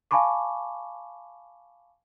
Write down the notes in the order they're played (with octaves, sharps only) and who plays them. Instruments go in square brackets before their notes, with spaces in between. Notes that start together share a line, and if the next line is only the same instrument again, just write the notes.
[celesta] F5 G#5 A5 B5 C#6 D6